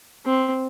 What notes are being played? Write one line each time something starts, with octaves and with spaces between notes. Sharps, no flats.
C4